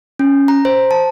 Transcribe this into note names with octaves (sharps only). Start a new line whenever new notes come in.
C#4
A#5
C5
A5